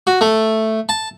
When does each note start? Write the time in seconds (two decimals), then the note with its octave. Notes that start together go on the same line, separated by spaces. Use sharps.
0.07 F#4
0.21 A3
0.89 A5